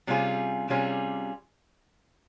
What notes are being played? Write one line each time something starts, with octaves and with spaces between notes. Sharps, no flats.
C3 G3 C#4 F4 G#4
C3 G3 C#4 F4 G#4